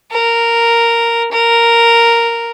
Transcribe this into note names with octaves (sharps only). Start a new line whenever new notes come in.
A#4
A#4